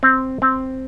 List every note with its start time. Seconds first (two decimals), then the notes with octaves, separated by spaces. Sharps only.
0.03 C4
0.42 C4